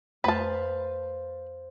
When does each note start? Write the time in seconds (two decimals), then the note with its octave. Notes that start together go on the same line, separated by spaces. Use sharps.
0.24 F2 A3 B4 C5 F5 A5